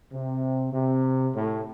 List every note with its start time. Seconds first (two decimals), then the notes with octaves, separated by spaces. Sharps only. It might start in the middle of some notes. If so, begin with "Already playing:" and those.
0.12 C3
0.73 C3
1.34 A2